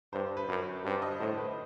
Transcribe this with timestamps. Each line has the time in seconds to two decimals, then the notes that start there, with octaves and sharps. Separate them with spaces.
0.13 G2 C5
0.37 B4
0.48 F#2
0.85 G2 C5
1.02 D#5
1.20 A2 C5
1.37 B4